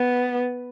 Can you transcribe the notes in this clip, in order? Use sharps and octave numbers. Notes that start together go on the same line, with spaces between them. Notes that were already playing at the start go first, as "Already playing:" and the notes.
Already playing: B3